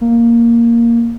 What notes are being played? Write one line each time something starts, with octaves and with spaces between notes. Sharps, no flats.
A#3